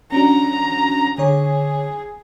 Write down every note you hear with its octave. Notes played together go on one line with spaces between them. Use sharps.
C#4 D4 F#4 A#5
D3 G#4 C#5